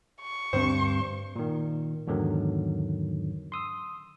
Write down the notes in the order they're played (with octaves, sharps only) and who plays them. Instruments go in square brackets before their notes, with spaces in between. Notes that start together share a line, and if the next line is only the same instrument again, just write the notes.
[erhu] C#6
[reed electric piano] D2 C4 [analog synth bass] G2 [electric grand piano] C5
[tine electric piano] A#2 D#3
E2 G#2 D3 D#3 F#3
C6 D#6 E6